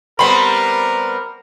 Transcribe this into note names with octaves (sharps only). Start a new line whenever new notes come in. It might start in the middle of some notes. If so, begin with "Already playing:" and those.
G3 B3 C4 A#4 B5 C6